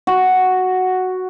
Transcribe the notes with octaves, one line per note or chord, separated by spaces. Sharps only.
F#4